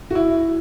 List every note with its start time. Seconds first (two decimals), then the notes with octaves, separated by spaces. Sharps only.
0.11 F#4
0.15 E4